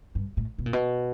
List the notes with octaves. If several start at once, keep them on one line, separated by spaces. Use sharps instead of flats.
G2
A2
B2
A#2
B2